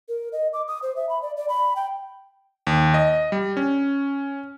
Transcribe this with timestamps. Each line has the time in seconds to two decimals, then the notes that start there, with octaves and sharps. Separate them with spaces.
0.09 A#4
0.33 D#5
0.53 D6
0.68 D#6
0.83 C5
0.96 E5
1.09 B5
1.22 D5
1.37 D5
1.49 B5
1.76 G5
2.67 D#2
2.94 D#5
3.32 G3
3.57 C#4